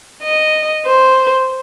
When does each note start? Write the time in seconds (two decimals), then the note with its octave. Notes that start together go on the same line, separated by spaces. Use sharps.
0.22 D#5
0.86 C5